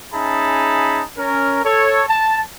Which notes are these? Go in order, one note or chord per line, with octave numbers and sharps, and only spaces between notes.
C#4 D#4 G#4 E5 A5 B5
C#4 A#4
A4 C#5
A5